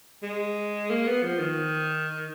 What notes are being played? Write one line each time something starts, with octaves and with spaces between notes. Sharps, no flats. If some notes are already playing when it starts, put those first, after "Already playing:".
G#3
A#3
B3
F3
D#3